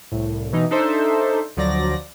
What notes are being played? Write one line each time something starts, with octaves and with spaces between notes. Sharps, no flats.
C2 A2
B2 E3 D#4
D4 D#4 A4 C5 E5
D2 F3 F#3 D5 A#6